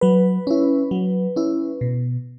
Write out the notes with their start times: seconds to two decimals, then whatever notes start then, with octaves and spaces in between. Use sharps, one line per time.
0.01 F#3 B4
0.47 C#4 E4
0.91 F#3
1.36 C#4 E4
1.81 B2